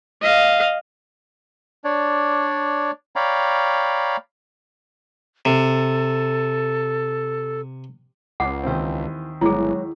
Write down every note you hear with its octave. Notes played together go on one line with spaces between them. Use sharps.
D#5 F5
D4 C#5 D5
C#5 D5 F5 G5 A#5 B5
C3 A4
C#2 F#5 D6
D#2 E3 C4 C5
G1 F#3 G#3 E4 G#4 B4